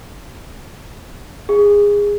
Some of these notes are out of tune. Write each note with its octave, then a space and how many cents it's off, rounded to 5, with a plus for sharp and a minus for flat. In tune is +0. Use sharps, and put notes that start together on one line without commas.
G#4 -20